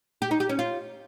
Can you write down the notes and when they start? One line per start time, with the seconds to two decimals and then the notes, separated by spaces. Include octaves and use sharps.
0.22 G4
0.31 D#4
0.40 G4
0.49 C#4
0.59 F4